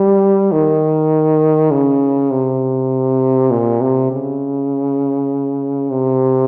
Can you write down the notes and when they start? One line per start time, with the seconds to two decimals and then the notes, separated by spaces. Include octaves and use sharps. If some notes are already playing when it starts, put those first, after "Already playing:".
Already playing: G3
0.52 D#3
1.71 C#3
2.31 C3
3.51 A#2
3.81 C3
4.11 C#3
5.90 C3